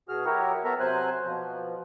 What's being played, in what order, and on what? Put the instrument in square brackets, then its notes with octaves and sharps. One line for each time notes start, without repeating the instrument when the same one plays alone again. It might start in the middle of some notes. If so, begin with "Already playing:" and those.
[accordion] B2 F#4 G#4 F6
F#3 E4 F#4 G4 A#4 C#5
B3 F#4 A4 A#4 E5 A#5
C3 F#3 C5 G#5 F#6
B2 F3